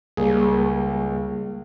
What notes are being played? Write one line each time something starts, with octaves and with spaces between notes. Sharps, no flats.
C#2 G3 A#3 G#4